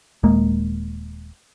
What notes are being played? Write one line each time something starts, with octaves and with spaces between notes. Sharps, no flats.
D#1 G#3 A#3